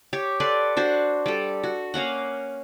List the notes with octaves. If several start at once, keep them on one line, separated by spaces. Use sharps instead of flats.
G4 C#5
A4 B4 D5 C6
D4 F#4 C5
G3 A4
F#4
A#3 C#4 F5 F#5